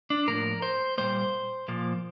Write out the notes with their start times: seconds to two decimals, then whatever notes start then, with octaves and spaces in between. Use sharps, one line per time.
0.10 D4
0.27 A2 F3 A#3 A#4
0.62 C5
0.98 A#2 G3 A#3 C5
1.68 A#2 F3 A#3